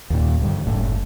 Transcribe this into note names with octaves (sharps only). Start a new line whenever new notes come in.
D#2 A#2
D2 G2
F#1 A2